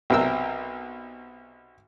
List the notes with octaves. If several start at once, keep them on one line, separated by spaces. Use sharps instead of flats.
B1 C3 A#4 E6